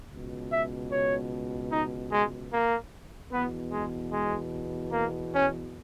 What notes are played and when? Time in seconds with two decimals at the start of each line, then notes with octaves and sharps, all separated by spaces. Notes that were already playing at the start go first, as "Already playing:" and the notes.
0.10 C#2 B2
0.50 E5
0.91 C#5
1.70 D#4
2.11 G#3
2.52 A#3
3.31 E2 B2 B3
3.72 G#3
4.11 G#3
4.92 A#3
5.32 C#4